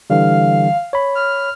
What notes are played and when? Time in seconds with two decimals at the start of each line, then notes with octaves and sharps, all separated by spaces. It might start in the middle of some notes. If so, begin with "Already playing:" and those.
0.10 D3 E3 G3 F5
0.93 C#5 B5
1.15 F6